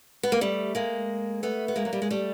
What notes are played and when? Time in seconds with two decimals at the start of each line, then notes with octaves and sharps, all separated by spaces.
0.23 B3
0.32 A#3
0.41 G3 A3
0.75 G#3 A#3
1.43 A3 B3
1.68 B3
1.76 G#3 A#3
1.85 F#3
1.93 G3
2.02 G#3
2.10 G3 A3